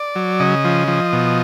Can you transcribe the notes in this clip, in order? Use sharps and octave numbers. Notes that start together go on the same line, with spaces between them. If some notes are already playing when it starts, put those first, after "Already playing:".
Already playing: D5
F#3
C#3 D#5
F3
F3
B2